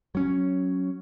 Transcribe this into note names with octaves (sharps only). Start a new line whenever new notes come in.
F#3 C#4